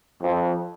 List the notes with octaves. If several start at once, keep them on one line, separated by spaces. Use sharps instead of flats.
F2